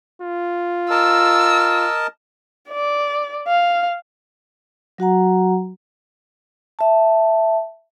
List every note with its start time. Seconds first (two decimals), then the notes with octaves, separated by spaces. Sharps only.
0.22 F4
0.90 A#4 D#5 A5 E6
2.69 D5
3.48 F5
4.98 F#3 F#4 F#5 A#5
6.79 E5 A5